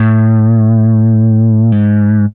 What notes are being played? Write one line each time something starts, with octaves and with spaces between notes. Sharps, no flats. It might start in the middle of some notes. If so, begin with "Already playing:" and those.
Already playing: A2
G#2